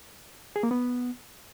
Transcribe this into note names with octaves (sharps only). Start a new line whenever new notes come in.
G#4
A#3
B3